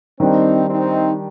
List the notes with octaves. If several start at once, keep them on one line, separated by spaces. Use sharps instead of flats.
D#3 G3 C4 D4 D#4
C4 D#4